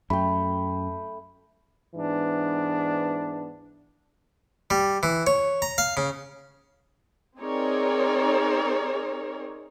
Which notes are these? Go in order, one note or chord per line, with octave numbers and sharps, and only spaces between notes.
F#2 A3 G5 B5
G#2 E3 B3 D4
G3
E3
C#5
A#5
F5
C#3
C4 D#4 G#4 A#4 C#5 D5